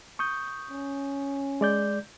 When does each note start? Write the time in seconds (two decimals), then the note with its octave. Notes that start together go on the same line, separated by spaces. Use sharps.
0.19 C#6 D#6 G6
0.71 C#4
1.61 G#3 D5 G6